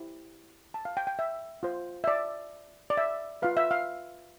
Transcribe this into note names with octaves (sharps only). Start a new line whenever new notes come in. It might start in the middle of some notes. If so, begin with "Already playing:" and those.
Already playing: E4 G4 C5
A5
F5
G5
G5
E5
F4 C5
E5
D5
D5
E5
F4 B4 F5
E5
F5